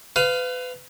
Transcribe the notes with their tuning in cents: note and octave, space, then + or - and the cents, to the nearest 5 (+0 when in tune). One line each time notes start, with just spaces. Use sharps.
B4 +30 F5 +0